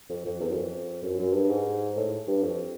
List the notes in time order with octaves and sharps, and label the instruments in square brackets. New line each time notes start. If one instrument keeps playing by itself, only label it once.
[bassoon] F2
F2
E2
F#2
F2
F#2
F#2
G2
G#2
A2
G2
F2